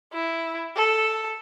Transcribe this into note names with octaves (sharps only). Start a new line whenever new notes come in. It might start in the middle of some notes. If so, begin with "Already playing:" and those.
E4
A4